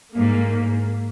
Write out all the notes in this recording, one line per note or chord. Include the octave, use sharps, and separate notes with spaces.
G#2 A#3